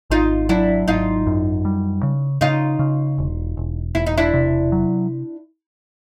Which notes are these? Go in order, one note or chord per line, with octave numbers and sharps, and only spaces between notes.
G#1 D#4 F4
F#3 D4 E4
G#1 D#4 F4
F#2
G3
C#3
C#3 D#4 F4
C#3
E1
E1
E1 E4
D#4
D4 E4
C3
F#3